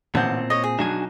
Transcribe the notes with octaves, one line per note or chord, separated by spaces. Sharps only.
A1 A#2 C4 F#5 A5 G6
C#5 D#5 A#6
G#4
B1 D4 F#4 G#5